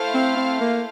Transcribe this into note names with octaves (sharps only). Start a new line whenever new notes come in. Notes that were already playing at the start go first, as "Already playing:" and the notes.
Already playing: A3 E4 A4 C5 F5
C4
C4
A#3